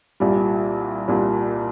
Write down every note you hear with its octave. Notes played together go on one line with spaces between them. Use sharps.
C2 A#2 G3
C2 A#2 G3